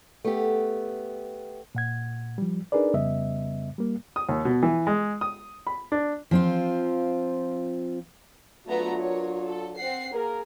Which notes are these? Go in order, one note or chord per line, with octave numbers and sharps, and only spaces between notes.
A3 B3 G4
A#2 F#5 G#6
F3 G3
D4 D#4 G#4 A#4 B4 D5
F2 C#3 G3 B3 D#5 E5
G3 A#3
D#6
D#2
B2
E3
G#3
D#6
B5
D4
F3 C4 F4
F#3 A3 B3 D4 F4 A#5
A#4 C#5
A4
C4 F#5 C7
A#3 G#4 A#4